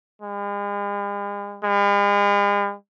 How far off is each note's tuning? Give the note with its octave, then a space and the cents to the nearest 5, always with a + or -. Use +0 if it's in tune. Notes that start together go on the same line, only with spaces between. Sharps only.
G#3 -45
G#3 -45